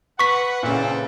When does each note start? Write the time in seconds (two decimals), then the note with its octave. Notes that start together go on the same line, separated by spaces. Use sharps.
0.19 B4 F#5 C#6 B6
0.63 A#2 C#3 E3 C4 A4